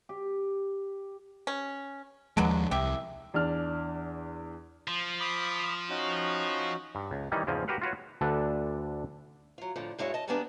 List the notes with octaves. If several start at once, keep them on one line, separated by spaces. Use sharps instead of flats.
G4
C#4
D#2 B2 D3 F3 F#3 G#3
C2 G4 E5
E2 D4 F6
F3 F4
B5 D6 D#6
C#4 D#4 F#4
G2
C#2
D#3 E3 G3 C#4 D#4
E2 G#2 C#3 F3 C4 G#5
F#4 G4 A#4 B4 F5 F#5
F4 F#4 B4 C#5
D2 D3 D4 A4 B4
F#3 F4
F2 A2 D3 F3
G2 G#3 E4 F#4 C#5
D#5 A5
D#3 G3 G#3 A#3 B3 D4